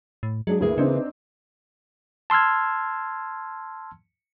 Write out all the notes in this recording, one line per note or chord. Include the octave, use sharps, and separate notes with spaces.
A2
F#3 G#3 D4 G#4
D2 E3 A#3 G#4
C#3 C4 D4 D#4
A5 C6 E6 F6 G#6